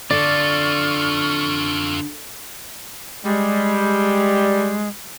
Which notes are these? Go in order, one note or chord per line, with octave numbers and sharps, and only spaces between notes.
D3 F4 A4 D5 C#6 F6
G3 G#3